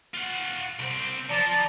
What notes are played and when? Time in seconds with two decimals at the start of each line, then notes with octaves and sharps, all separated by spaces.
0.14 F4 F#5
0.79 C2 C4
1.30 F3 D5 A5 A#5